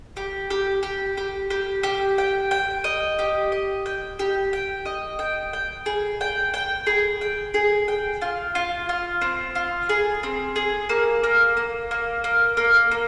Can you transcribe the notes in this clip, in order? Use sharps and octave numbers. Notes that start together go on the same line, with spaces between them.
G4
G4
G4
G4
G4
G4
G5
G5
D#5
G4
D#5
G5
G4
G5
D#5
G5
G5
G#4
G5
G5
G#4
G5
G#4
G5
F4
F4
F4
C4
F4
G#4
C4
G#4
A#3
A#3
A#3
A#3
A#3
A#3
A#3